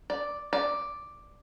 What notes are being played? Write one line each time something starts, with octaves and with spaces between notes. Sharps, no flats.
D5
D5